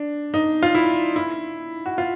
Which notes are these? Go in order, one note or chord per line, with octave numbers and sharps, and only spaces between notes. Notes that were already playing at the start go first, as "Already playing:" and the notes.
Already playing: D4
D#4
F4
E4
E4
F#4
F4